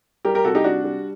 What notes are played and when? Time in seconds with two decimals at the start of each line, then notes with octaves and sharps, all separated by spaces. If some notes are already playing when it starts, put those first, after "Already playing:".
0.25 G3 G4 A#4
0.35 G4 A#4
0.45 C3 F#4 A4
0.55 D#4 G4
0.64 G3 D4 F#4
0.84 G3